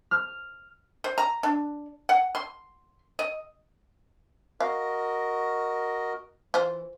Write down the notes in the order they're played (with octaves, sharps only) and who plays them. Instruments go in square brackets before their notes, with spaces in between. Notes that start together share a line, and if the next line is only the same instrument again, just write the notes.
[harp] F6
[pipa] C5
A#5
D4
F#5
C6
D#5
[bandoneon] F#4 A#4 D#5 [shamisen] F5
[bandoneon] E3 [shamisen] F4 C5